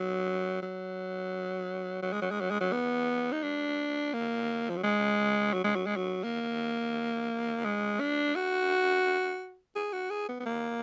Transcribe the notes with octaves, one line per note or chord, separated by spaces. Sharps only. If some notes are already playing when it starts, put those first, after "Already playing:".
Already playing: F#3
F#3
F#3
G#3
F#3
G#3
F#3
G#3
F#3
B3
D#4
D4
A#3
F3
F#3
G#3
F#3
G#3
F#3
G#3
F#3
A#3
G#3
D4
F#4
G#4
F#4
G#4
B3
B3
A#3